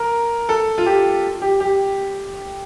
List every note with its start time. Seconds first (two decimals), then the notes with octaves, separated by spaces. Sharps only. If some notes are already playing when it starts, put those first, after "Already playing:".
Already playing: A#4
0.49 A4
0.78 F4
0.86 G4
1.42 G4
1.60 G4